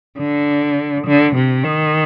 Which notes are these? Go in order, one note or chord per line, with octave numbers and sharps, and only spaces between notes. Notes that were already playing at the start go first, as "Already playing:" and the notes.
D3
D3
C3
D#3